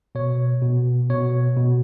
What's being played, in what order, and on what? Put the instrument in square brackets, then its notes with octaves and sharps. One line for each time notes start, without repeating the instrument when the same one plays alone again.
[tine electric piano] B2 C#5
B2
B2 C#5
B2